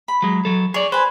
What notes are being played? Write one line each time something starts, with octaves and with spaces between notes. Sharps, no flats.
B5
F#3 G#3
F#3 A4
G#4 C#5 D5
B4 C5 G#5